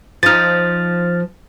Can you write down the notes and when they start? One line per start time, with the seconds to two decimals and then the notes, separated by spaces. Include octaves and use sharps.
0.23 F3 D#4 F6 A6